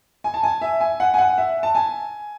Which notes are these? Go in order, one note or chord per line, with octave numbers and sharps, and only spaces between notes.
G#5
A5
G#5
E5
G#5
F#5
G#5
F#5
E5
A5
G#5